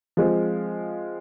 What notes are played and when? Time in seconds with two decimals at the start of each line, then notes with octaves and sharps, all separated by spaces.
0.17 F3 G#3 C4